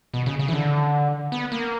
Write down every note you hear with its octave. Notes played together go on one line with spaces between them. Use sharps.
B2
C#3
C#3
E3
D3
B3
A#3